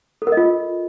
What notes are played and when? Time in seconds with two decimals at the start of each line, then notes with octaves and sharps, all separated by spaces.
0.22 A4
0.27 A#4
0.32 D#5
0.37 F4